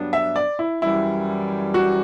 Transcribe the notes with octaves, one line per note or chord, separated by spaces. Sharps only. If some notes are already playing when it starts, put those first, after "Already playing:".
Already playing: G2 F#3 B3 D4
E5
D5
E4
F#2 E3 G3 E4
F#4